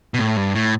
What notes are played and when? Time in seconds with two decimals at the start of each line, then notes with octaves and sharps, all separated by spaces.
0.14 B2
0.19 A2
0.37 G2
0.55 A2